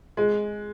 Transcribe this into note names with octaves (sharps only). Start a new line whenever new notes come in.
G#3